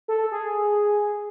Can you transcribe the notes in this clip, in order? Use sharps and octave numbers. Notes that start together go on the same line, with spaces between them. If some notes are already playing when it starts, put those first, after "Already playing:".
A4
G#4